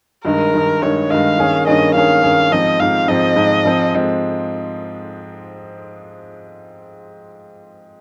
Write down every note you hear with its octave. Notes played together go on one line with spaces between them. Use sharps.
G2 D#3 G#3 A#4
G2 D#3 G#3
G2 D#3 G#3 C#5
G2 D#3 G#3 F5
G2 D#3 A#3 C#4 G#4
G2 D#3 A#3 C#4 G#4 D#5
G2 D#3 A#3 C#4 G#4 F5
G2 D#3 A#3 C#4 G#4
G#2 F3 C4 D#5
G#2 F3 C4 F5
G#2 F3 C4 D#5
G#2 F3 C4
G#2 F3 G#3 C4
F3 G#3 C4